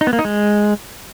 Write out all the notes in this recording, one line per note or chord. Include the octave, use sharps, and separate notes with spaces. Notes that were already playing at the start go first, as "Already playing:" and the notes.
D#4
B3
A#3
D#4
G#3